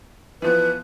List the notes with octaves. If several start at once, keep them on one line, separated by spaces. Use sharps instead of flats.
E3 F3 B3 B4